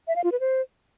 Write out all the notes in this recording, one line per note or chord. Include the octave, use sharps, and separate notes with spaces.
E5
F5
F4
B4
C5